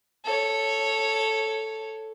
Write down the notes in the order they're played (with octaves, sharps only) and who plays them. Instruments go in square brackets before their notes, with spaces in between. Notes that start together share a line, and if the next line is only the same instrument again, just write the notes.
[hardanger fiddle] A4 C#5